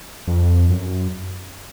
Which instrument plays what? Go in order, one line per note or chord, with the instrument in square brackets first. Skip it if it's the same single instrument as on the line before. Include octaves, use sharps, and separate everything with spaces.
[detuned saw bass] F2
F#2